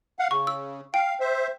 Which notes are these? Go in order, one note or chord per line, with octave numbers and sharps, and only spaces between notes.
F5 F#5
C#3 C#6
E6
F5 G5
C5 E5